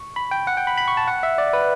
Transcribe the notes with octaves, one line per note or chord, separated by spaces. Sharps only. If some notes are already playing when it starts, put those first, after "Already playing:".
Already playing: C#6
B5
G5
F#5
G5
B5
B5
C#6
A5
F#5
E5
D5
B4